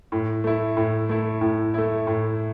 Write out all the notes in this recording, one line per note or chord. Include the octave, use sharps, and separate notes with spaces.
A2
A3 E4
A2
A3 E4
A2
A3 E4
A2